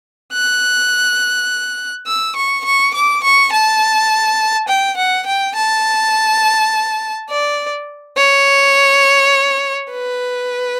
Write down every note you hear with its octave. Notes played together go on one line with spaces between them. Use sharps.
F#6
E6
C#6
C#6
D6
C#6
A5
G5
F#5
G5
A5
D5
C#5
B4